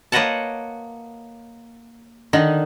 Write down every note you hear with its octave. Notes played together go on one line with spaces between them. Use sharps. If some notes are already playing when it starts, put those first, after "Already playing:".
A#3 B4 C#5 D#5 F#5 A5
D3 D#3 D#4